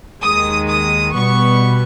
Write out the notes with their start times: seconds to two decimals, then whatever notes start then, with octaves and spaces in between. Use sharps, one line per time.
0.22 D#2 D#3 G#3 D#6
0.68 D#6
1.14 B2 G3 B3 C#6